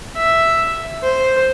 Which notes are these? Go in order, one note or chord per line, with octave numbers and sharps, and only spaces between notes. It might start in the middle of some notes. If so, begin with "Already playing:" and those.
E5
C5